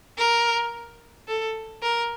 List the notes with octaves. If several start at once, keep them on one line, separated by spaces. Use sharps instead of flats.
A#4
A4
A#4